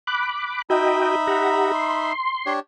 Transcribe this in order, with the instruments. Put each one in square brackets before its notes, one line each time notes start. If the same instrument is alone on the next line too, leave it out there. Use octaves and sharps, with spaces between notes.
[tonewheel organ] B5 D6 F#6
[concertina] D#4 E5 B5 [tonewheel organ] F#4 D#5 G5
[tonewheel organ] G4 F#5 A#5
C6
[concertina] D4 G4 C#5